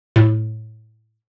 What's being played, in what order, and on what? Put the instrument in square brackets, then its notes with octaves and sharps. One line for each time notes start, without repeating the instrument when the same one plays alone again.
[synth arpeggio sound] A2